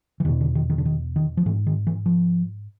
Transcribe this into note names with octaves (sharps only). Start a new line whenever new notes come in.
E3
E2 B2 D#3
D3
D#3
D#3
D3
D#3
D#3
F3
G#2 E3
D#3
E3
F3